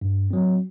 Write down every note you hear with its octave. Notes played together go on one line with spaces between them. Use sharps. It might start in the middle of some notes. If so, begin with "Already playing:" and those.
G2
F#3 C4